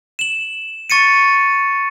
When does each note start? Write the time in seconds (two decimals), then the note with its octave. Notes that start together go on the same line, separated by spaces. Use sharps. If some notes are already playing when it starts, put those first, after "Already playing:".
0.19 E7 F#7
0.90 C#6 A6 C#7 D#7